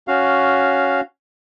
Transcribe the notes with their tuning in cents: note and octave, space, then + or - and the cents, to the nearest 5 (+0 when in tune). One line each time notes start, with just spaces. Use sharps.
C#4 +5 F#4 +0 F5 +0